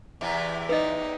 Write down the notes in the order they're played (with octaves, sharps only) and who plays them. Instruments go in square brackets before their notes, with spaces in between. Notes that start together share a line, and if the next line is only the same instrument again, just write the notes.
[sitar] E2 C3 E3
[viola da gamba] D#4 [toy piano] B4 D#5